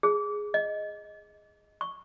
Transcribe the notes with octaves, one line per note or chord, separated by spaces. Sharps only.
G#4
D#5
C#6